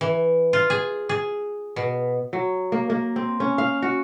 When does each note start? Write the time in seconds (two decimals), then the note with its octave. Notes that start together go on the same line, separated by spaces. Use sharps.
0.01 E3
0.53 F4
0.70 G#4
1.09 G#4
1.76 B2
2.33 F#3
2.72 A#3
2.90 A#3
3.16 C4
3.40 C#4
3.58 F5
3.82 F#4